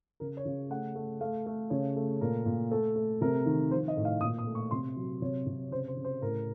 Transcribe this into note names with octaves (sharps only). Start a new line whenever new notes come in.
C#3 A#4
C#5
C#3
A3 F#5
A3
A3 F5
A3
C#3 C#5
A3
A#2 A#4
A#2
A3 A4
A3
C3 A#4
D#3
F3 C5
D#5
A2
F5
A#2 D#6
D#6
A3
C#6
C3 C6
F#3
C3 C#5
C3
C#3 C5
C5
C#3
C5
A2 A#4